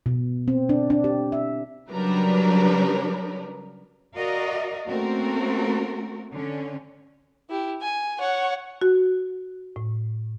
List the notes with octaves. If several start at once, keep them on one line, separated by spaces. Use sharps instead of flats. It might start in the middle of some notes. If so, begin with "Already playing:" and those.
B2
C4
D4
D4
G4
E5
C#3 F#3 G3 D4 A#4 B4
F#4 A#4 D5 D#5 F5
A3 A#3 C4 C#4 F#4 A#4
D3 C#4
E4 G4
G#5
C#5 F#5
F#4
A2